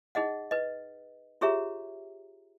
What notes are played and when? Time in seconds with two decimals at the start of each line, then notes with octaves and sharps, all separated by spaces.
0.15 D#4 G#4 D#5 F#5
0.51 B4 D#5
1.41 F4 G4 G#4 C#5 E5 A#5